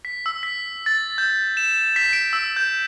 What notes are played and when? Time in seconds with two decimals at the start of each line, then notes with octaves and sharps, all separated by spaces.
0.05 B6
0.26 E6
0.43 B6
0.86 A6
1.18 G6
1.57 E7
1.96 B6
2.13 D7
2.33 E6
2.56 G6